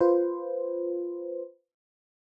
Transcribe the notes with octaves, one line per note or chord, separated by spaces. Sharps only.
F4 B4 C5